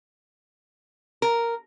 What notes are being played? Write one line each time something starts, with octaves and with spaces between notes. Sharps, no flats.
A#4